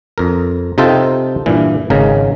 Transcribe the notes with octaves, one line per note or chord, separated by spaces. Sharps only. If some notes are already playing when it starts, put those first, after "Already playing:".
F2 A#4
C3 D#4 F4 A4 G5 A5
G2 A#2 E3
G#1 C#3 D#4 A#4